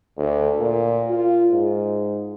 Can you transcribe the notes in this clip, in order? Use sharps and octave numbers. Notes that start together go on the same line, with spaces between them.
D2
A#2
F4
G#2